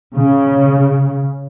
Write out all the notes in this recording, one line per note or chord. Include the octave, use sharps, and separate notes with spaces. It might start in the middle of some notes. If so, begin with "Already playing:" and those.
C#3